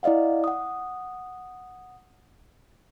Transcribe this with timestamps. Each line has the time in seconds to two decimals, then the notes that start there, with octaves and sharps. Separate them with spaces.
0.03 E4 D5 D#5 F5 F#5
0.44 F#5 D#6